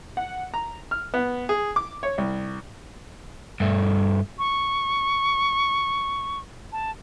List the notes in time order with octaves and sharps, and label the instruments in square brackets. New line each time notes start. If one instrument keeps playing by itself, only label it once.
[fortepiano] F#5
A#5
F6
B3
G#4
D6
C#5
C2
[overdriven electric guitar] G2 A3
[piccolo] C#6
A5